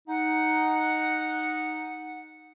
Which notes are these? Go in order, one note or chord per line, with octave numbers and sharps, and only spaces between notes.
D#4 F#5